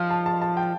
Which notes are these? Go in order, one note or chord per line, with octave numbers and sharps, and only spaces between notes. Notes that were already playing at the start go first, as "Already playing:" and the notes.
Already playing: F3 F5
A5
A5
A5
G5